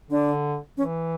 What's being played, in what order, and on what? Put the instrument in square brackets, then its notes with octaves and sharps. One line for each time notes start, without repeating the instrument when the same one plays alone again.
[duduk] D3 [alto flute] D4
[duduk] E3 [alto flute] C#4